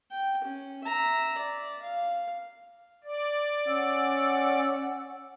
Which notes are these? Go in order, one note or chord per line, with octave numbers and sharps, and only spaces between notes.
G5
C#4
E5 A#5
D5
F5
D5
C#4 F#5 E6